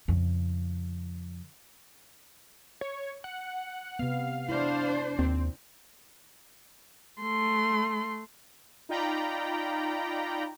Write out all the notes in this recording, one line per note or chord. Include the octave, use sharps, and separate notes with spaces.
F2 C#3
C#5
F#5
C3 B3 F5
D4 E4 C5
D#2 C4
A3 C6
D#4 F4 D5 G5 A#5 B5